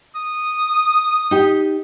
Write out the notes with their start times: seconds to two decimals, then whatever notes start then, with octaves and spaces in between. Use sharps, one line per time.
0.15 D#6
1.31 D#4 G4